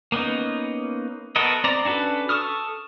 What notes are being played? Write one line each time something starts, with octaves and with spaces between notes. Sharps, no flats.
A#3 B3 C#4 D#4
B3 F#4 A4 A#4 D#5
C4 D5 A#5
C#4 D4 F#4 A4 B4
A4 C#6 D#6 F6